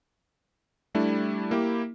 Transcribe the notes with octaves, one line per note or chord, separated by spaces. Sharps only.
G3 A3 D4 E4
A#3 E4 G4